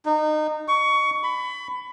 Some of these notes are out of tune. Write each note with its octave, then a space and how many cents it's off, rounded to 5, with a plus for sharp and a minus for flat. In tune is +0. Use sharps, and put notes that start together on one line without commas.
D#4 -25
C#6 +20
B5 +20